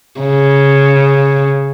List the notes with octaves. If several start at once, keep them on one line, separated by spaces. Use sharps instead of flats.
C#3